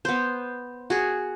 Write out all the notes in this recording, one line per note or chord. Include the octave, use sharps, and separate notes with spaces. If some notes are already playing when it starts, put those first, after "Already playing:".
B3 C5
F#4 G#4